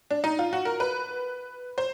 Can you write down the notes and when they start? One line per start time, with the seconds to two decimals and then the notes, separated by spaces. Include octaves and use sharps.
0.11 D4
0.24 D#4
0.39 F4
0.53 F#4
0.65 A#4
0.80 B4
1.78 C5